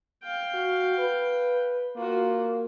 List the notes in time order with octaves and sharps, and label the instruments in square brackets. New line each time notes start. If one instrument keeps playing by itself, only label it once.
[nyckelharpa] F5 G5
[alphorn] F#4
B4
[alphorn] A#3 [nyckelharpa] F4 F#4